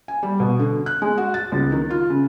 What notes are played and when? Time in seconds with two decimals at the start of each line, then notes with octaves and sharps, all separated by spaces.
0.08 G#5
0.23 G3
0.40 B2
0.59 D3
0.86 F#6
1.02 G#3
1.18 F#4
1.34 A6
1.52 C#2
1.72 D#3
1.90 F4
2.10 C#3